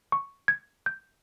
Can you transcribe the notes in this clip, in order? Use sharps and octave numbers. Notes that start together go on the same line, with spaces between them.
C#6
G#6
G6